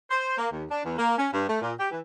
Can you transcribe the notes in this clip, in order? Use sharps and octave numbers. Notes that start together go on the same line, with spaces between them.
C5
A#3
D#2
D4
E2
A#3
C#4
G2
A3
A#2
G4
E3